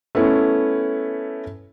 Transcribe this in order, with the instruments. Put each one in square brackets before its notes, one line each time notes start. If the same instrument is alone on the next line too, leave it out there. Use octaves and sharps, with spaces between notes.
[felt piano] A3 B3 C#4 E4